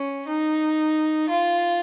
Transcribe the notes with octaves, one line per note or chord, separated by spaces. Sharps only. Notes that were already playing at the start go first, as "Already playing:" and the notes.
Already playing: C#4
D#4
F4